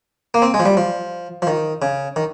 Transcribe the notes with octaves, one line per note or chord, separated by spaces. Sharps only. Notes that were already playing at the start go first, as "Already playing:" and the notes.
A#3
C4
G#3
F3
G3
F3
F3
D#3
C#3
D#3